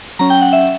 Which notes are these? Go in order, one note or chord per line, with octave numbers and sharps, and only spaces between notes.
F#3 C#4 A#5
G5
F#5
E5